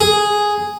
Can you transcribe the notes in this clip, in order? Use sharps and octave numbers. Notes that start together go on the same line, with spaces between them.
G#4